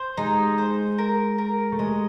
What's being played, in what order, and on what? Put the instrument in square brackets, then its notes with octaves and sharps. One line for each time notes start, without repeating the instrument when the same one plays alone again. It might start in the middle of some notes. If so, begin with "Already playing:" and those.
Already playing: [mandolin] C5
[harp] G#3 [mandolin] D#4
[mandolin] C5
A#4
A#4
[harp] A3
[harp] G#3 [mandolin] D#5